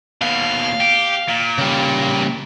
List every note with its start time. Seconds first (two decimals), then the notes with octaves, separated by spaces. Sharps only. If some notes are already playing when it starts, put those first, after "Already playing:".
0.22 D#2 B2 F5
0.81 G4
1.28 A#2
1.58 C#3 G3